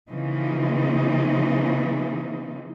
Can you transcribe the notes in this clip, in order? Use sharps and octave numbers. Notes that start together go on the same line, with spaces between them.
C#3 E3 F3 A#3 C4 D#4